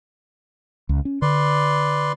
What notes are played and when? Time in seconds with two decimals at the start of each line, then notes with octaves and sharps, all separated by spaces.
0.89 C#2
1.05 C#4
1.22 D3 B4 D5 C6